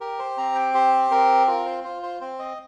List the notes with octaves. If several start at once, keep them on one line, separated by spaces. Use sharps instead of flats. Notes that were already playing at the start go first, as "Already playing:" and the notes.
G4 A#4
C5
C4 A#5
G5
G4 C5
C4 A#4
F4 A#4
C5
F4 C5
C5
C4 C5
D#5